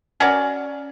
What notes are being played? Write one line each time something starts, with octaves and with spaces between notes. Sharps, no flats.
C#4 F#4 A#4 D5